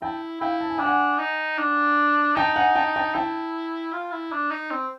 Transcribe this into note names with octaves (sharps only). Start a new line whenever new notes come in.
E4 G5 A5
E4 F5 G5
A5
G#5
D4 G5
F#5 G#5
D#4
D4
D#4 G5 A5
F#5 G#5
G5 A5
G5 A5
E4 G5 A5
F4
E4
D4
D#4
C4